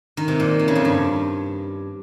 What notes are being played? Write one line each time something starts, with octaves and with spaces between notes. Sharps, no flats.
D#3
C3
A#2
C3
C#3
F2
G2